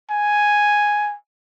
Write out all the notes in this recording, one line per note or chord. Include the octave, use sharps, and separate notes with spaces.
G#5